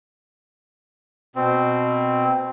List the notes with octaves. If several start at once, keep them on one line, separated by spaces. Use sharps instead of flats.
B2 C4